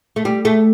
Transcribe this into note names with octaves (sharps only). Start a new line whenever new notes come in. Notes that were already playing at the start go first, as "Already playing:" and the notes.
A3
G3
A3